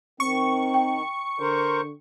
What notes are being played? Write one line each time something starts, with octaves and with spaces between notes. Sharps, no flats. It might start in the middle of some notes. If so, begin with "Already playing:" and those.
D#3 C4 C#6
G5
D3 A#4 C5